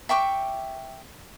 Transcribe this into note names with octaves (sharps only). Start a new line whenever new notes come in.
E5 G5 C#6 D6